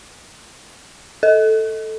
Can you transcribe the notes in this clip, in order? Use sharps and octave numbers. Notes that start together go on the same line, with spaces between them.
A4